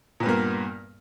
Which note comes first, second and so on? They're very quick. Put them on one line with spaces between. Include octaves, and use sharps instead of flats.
A#2 B3 G2 A#3